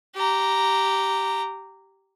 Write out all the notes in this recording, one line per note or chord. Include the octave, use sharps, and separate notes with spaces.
G4 A#5